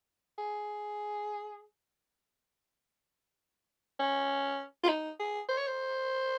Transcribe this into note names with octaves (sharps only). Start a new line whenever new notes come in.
G#4
C#4
F4
D#4
G#4
C5
C#5
C5